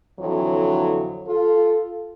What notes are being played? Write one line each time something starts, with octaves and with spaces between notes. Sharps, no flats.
F2 D3 E3 F#3
F4 A4